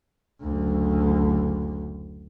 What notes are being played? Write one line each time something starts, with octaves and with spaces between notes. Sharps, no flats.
F#1 D2